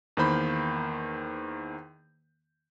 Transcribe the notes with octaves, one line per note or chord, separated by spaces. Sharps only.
E2 D#3 A#3 C5 B5 G6